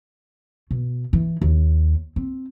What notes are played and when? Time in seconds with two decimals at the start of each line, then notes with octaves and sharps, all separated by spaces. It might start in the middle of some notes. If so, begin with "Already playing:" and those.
0.71 B2
1.13 E3
1.41 D#2
2.16 C4